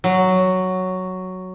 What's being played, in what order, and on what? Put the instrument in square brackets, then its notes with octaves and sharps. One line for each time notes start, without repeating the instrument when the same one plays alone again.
[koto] F#3